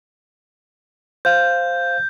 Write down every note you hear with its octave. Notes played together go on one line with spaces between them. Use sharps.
C5 F5 G6